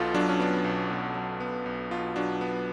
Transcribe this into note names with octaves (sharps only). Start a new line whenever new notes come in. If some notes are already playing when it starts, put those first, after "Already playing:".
Already playing: B1 B2 F4 A4
F#3 D4
C#4
B3 D4
B1
B2
F#3
B3
B1
B2 F4
F#3 D4
B3